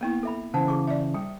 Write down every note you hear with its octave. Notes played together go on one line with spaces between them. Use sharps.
A#3 B3 E4
A4 E5 B5
C#3 E3 C5 F#5 A5
G#4 C#6 D6
D5 E5
G3 G5